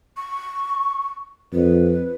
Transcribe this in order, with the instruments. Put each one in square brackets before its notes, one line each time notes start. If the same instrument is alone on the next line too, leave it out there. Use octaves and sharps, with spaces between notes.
[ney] C#6
[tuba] F2 [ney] B4